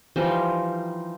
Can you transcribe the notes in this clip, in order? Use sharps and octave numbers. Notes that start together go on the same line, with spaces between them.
E3 F3 G3 D#4